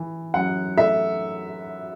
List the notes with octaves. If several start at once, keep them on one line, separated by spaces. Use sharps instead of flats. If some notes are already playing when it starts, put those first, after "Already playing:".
Already playing: E3
F#2 F#5
A3 E5